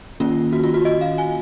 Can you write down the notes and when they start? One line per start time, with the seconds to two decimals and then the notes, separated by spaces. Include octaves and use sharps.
0.20 D#3 A#3 C#4 F4
0.53 F#4
0.64 F4
0.74 F#4
0.85 D#5
1.01 F5
1.18 G#5